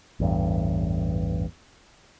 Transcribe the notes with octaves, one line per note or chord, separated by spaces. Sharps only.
A1 E2 G2